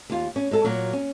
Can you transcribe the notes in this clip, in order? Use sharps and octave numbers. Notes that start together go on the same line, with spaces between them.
D#2 F4
C#4
G#3 A4
A#2 F#3
C#4